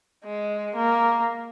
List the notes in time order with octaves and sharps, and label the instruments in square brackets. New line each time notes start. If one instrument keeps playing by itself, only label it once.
[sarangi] G#3
A#3